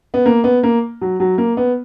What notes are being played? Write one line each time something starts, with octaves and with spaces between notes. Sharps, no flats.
B3
A#3
B3
A#3
F#3
F#3
A#3
B3